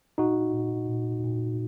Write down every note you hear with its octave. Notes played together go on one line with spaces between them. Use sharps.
A#2 D#4 F#4
A#2
A#2
A#2